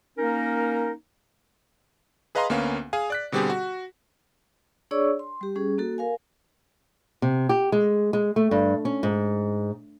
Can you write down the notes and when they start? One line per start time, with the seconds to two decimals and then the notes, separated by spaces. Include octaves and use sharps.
0.18 A#3 C#4 D#4 A#4
2.35 G#4 B4 D#5 F5 A#5 C6
2.50 D2 A#3 B3 C#4 F5
2.93 G#4 F5 G#5
3.10 D5 F#6 B6
3.32 B2 D3 G3 C4 G4 G#4
3.50 F#4
4.91 D4 G#4 C#5 D5 C#6 E6
5.19 C6
5.41 G3 G4
5.55 G3 C#4 G#4
5.78 A#3 F#4 A4
5.98 A#4 F5 G#5
7.22 C3
7.49 G4
7.72 G#3
8.13 G#3
8.36 A3
8.51 G2
8.85 C#4
9.03 G#2